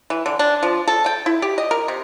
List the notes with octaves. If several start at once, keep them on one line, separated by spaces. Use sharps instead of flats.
E3
D3
D4
F3
A4
G5
E4
G4
D#5
A#4
C3